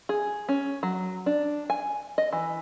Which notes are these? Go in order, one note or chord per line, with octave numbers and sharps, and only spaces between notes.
G#4
C#4
F#3
D4
G#5
D#5
E3